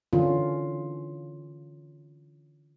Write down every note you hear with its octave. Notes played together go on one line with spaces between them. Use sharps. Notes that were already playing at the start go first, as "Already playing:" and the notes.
D3 E3 C#4 F4